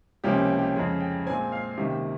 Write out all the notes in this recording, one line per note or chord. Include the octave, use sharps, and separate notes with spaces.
C#2 C3 F3 A#3 C#4 G4
G4
G4
F2 C#3 G#3 G#4
G5
A#2 G#3 C4 G#5
F5
C#2 C3 D#3 A#3 G4